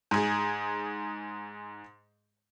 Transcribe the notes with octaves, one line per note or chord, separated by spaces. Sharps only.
G#2 G#4